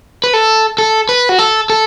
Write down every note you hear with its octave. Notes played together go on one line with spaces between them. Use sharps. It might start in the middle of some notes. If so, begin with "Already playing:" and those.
B4
A4
A4
B4
F#4
A4
A4